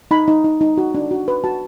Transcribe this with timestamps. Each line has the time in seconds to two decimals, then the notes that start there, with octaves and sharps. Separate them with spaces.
0.11 D#4 B5
0.28 D#4
0.44 D#4
0.61 D#4
0.78 F#4
0.95 D4
1.11 F#4
1.28 B4
1.44 F#4 A5